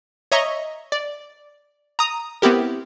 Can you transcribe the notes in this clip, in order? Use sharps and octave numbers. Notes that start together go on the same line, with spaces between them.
C#5 D#5 E5 A#5 C#6
D5
A#5 D#6
B3 C4 E4 G4 A#4